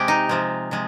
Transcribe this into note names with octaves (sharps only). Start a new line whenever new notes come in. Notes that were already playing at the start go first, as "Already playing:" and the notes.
Already playing: C3 G#3 G4
D#4
C3 F3 G#3
C3 F3 G#3